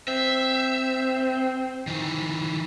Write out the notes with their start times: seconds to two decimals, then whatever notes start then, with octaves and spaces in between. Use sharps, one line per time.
0.08 C4 E5
1.87 D#3 E3